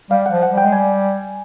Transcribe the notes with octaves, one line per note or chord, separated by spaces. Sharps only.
G3 F5
F#5
F3
F#5
G3
G5
G#3
G3 G#5